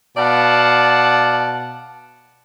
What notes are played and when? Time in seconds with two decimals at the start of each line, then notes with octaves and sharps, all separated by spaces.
0.17 B2 D5 F5 F#5 A5